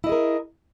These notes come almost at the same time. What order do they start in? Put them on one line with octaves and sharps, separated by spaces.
E4 D#5 G#4 A#4